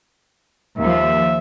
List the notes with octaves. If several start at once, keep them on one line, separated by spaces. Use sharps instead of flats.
D#2 F3 E5